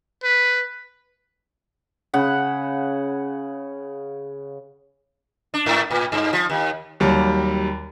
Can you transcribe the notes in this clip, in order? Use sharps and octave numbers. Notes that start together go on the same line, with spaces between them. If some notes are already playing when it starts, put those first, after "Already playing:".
B4
C#3 F#5 B5
D4
G#2
A2
G2
F3
D#2
D#2 F#3 G3